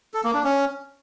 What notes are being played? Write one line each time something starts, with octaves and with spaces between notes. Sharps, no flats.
A4
A#3
D4
C#4